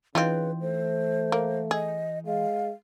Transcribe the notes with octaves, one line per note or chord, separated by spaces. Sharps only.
C#3 E3 C4 D#4 F4 B4
A3 C5
A#3
G#4 D#5
G#3 F5